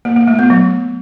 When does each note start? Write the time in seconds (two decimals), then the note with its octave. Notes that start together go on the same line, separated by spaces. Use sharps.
0.05 A#3
0.16 A#3
0.28 A3
0.39 B3
0.50 F#3